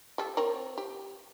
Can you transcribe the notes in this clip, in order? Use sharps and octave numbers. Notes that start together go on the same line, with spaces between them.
G3 A4
C4 A#4 C#5
G4